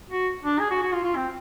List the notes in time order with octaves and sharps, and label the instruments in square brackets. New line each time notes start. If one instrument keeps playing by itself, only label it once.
[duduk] F#4
D4
G#4
F#4
F#4
F4
F4
C4